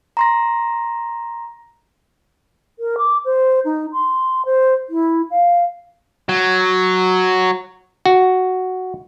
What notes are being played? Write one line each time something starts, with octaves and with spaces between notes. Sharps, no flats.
A#5 C6 A#6
A#4
D6
C5
D#4
C6
C5
E4
F5
F#3
F#4